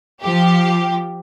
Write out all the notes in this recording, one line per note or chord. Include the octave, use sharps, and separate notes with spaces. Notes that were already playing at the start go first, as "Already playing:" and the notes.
F3 G4